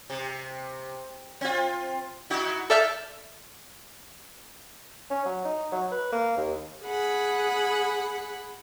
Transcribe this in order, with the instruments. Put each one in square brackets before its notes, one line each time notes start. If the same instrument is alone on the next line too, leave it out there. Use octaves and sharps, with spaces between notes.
[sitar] C3
C4 F4
D#4 E4 F#4
[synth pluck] A4 D5 E5 A5 F6 G6
[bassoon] C#4
F#3
D#4
F#3
B4
A#3
D#2
[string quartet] G#4 F#5 B5